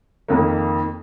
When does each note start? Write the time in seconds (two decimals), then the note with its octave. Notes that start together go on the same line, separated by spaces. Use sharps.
0.28 F2 D#3 A#3